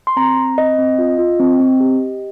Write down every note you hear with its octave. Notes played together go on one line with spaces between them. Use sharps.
C6
C4 A#5
C4
C4 D#5
C4
F4
F4
C4
C4
G4